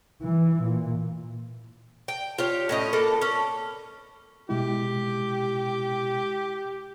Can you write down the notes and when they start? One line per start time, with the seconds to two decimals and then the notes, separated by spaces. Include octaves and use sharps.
0.23 E3
0.63 A#2
2.08 G5
2.38 F4 G4 C#5
2.69 A2 C#4 D#5
2.93 A#3 A4 B4
3.22 C#4
4.49 B2 G#3 E4 G4